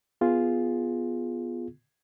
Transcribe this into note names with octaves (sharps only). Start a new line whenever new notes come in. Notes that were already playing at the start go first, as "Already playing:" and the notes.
B3 F4 G#4